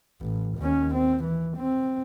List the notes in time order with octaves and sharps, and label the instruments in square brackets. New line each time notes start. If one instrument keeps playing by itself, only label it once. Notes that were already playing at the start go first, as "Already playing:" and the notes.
[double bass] A1
D#2 C#4
C4
E3
C4